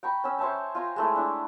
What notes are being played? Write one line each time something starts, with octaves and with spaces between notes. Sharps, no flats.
G5 A#5 B5 C#6
C#4 E6
C5 C#5 E5 A5
F4 G#5 A#5
G#3 A3 E4
D4 E4